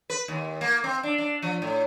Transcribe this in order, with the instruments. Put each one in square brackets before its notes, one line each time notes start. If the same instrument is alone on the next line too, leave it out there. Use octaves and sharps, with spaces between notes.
[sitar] B4
D#2
A#3
C4
D4
D4
F3
A2